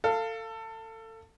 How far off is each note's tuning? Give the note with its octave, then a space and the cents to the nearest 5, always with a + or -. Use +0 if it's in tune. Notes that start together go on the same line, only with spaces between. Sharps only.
A4 +25 F5 -10